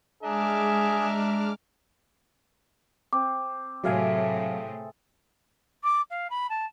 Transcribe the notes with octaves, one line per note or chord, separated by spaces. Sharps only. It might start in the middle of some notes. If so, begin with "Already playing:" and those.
G#3 D4 G#4 E5 A#5 D6 F6
C4 D6
A2 C3 F#3 G#4 A4 E5 F5 G#5
D6
F5
B5
A5